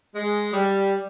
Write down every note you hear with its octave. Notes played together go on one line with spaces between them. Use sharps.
G#3
G3